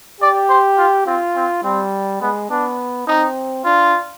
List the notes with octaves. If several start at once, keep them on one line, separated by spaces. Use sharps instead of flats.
G4 D5
C5
F4
C4 F4
C4
G3 C4
G#3 B3
B3 D4
C4 D#4
D4 F4